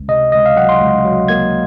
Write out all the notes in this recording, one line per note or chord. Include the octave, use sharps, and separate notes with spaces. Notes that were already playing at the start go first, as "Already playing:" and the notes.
Already playing: C#2
C3 D#5
C#2 D#5
F5
F#3 F#5
C6
C#2
F#3
A#3 G#6